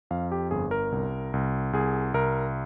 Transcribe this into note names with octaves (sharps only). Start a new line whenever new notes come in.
F2 F5
G4
G1 G#4
A#4
C2
C2
C2 G#4
C2 A#4